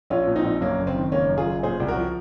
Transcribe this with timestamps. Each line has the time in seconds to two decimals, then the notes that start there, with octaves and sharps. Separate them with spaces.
0.10 A#1 C#4 F4
0.27 A#2
0.35 C4 D#4
0.44 A#1
0.61 F#2 A#3 C#4
0.79 F#1
0.87 C4
0.95 D#3
1.12 F#1 A#3 C#4
1.29 F#2
1.38 F4 G#4
1.46 F#1
1.63 A#2 G#4 C5
1.80 C2
1.88 F#4 A#4
1.96 F3